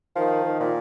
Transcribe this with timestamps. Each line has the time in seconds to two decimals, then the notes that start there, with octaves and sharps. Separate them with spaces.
0.16 D#3 F3
0.45 D#3
0.60 A#2